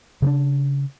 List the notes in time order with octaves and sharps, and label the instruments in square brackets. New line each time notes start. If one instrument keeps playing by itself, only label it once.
[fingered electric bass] C#3 C#4 D4